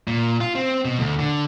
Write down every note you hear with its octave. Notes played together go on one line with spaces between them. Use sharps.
A#2
F4
C4
B2
D2
D3